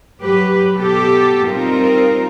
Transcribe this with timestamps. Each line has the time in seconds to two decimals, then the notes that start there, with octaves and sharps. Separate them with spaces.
0.21 F#3 G4 B4
0.77 B2 G4 A4
1.47 G3 C4 D#4 F4 A#4